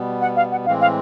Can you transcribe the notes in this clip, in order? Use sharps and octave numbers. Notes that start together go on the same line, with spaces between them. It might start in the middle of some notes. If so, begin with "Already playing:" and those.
Already playing: B2 G3 B3
F#5
F5
F#5
A2 E3 G#3 C4 F5
F5